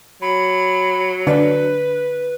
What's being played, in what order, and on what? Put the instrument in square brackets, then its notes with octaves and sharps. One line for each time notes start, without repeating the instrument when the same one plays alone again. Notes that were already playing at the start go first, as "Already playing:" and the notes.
[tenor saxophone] F#3 [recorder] B5
[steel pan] D3 D4 [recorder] B4